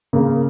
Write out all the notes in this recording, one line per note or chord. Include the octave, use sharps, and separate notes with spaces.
C#3 A#3